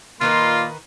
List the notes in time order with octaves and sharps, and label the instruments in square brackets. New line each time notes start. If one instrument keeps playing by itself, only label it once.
[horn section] A#2 A#3 [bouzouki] D#3 D#4 B4 [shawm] F4 [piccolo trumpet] C6